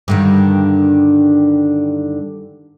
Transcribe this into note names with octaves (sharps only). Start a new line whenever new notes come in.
G2 D3 D#3